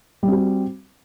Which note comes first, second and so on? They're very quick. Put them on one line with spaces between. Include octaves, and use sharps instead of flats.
G3 C4 F#4